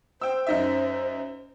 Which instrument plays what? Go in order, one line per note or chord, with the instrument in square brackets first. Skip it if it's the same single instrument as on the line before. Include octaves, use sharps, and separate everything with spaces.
[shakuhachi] C5 [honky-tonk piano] G5 E6
[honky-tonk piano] F#2 D#4 E5